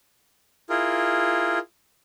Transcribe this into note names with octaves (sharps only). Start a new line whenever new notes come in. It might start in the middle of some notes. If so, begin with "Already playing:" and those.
E4 F4 G#4 A#4